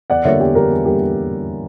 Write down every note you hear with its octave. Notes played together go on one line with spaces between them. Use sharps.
E2 D5 F#5
D3 G3 A#3 C#5 E5
E2 G4
D3 G3 A#3 A#4
E2
D3 G3 A#3 G4